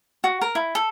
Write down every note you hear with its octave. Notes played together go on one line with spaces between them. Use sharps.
F#4
A#4
E4
A4